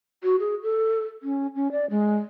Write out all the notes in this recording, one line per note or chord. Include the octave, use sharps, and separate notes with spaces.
F#4
G#4
A4
C#4
C#4
D5
G#3